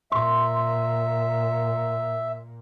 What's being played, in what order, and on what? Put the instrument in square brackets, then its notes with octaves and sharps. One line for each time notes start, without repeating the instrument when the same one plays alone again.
[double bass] A#2 [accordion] E5 [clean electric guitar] C6